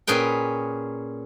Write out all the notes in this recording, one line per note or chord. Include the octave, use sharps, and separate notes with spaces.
A#2 C#4 G#4 B4 G5